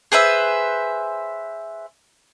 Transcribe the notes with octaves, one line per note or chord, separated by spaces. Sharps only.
G#4 B4 C5 E5